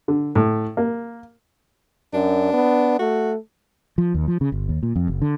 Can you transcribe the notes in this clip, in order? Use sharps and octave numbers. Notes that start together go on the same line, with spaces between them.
D3
A2
A#3
F#2 D4
B3
A3 F#4
F3
D#2
F3
C#3
G1
D#2
A#2
F2
F#1
D3